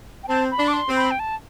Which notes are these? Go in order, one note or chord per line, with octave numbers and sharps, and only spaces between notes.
G5
C4 A5
B5
D4
D6
C6
C4
B5
G5
A5